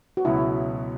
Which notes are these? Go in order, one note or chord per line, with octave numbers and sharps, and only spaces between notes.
F#4
C#2 B2 F#3 E4